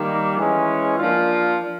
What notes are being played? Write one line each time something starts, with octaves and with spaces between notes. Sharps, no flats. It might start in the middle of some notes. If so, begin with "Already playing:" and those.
Already playing: D#3 G3 A#3
E3 G#3 C#4
F3 A#3 D4 F4